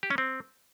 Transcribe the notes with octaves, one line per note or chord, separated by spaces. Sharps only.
G4
C#4
C4